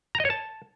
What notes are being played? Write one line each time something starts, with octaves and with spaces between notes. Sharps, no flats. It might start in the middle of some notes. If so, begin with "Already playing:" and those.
A#5
D#5
C#5
A5